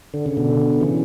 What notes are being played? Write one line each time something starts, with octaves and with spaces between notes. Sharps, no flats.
D3
C#3
B2 D3
C#3 E3